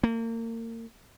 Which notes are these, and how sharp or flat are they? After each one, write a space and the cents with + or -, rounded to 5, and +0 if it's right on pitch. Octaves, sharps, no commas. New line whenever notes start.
A#3 -35